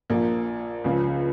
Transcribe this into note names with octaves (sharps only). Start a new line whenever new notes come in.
A#1 A#2 F3 A#3
C#2 C#3 F3